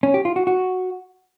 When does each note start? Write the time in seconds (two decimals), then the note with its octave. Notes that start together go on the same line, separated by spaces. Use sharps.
0.03 C#4
0.14 G4
0.25 F4
0.36 F#4
0.47 F#4